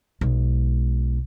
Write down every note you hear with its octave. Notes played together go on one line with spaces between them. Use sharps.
B1 G#3